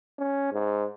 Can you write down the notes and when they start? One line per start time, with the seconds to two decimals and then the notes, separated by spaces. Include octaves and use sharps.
0.19 C#4
0.52 G#2